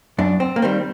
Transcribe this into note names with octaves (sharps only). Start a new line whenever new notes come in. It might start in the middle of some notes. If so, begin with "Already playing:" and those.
F#2 D4
C4
A#3
D#3 G3 C4